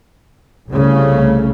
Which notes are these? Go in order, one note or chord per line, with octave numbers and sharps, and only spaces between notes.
C2 C#3 A3